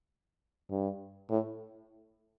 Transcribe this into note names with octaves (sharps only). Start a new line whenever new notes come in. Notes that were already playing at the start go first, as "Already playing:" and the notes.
G2
A2